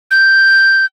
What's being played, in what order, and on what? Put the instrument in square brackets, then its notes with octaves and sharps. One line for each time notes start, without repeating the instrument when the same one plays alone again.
[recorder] G6